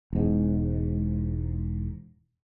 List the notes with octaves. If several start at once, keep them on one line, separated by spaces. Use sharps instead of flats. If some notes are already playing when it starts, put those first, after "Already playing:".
E1 G#2